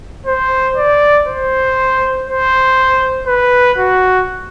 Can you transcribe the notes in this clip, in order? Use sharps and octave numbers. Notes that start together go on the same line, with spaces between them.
C5
D5
C5
C5
B4
F#4